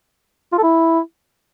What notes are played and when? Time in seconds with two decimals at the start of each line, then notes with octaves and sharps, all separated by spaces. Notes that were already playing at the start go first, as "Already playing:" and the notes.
0.53 F4
0.58 A4
0.63 E4